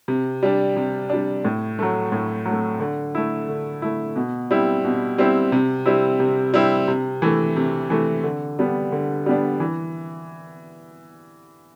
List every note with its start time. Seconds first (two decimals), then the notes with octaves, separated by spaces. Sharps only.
0.08 C3
0.43 G3 D4
0.77 C3
1.09 G3 D4
1.45 A2
1.79 F#3 A3
2.12 A2
2.46 F#3
2.51 A3
2.80 D3
3.15 A3 E4
3.49 D3
3.82 A3 E4
4.16 B2
4.51 G3 C4 E4
4.84 B2
5.18 G3 C4 E4
5.52 C3
5.86 G3 C4 E4
6.20 C3
6.54 G3 C4 E4
6.88 C3
7.22 E3 A3
7.56 C3
7.90 E3 A3
8.24 D3
8.59 G3 B3 D4
8.92 D3
9.26 G3 B3 D4
9.60 E3